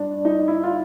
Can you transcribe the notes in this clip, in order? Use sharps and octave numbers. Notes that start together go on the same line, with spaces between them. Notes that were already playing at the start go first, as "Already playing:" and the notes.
Already playing: G2 D4
D#4
E4
F4